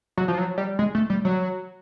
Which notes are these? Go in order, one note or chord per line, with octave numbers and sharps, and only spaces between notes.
F#3
F3
F#3
G3
G#3
A3
G3
F#3